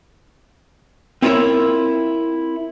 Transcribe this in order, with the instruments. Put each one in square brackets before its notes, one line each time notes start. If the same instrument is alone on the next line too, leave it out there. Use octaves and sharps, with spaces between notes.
[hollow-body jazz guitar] C4 E4 F4 A#4 C#5 E5